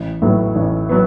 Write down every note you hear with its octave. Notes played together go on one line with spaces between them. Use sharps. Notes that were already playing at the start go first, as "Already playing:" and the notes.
Already playing: A1
A2 F#3 B3
A1
F#3 B3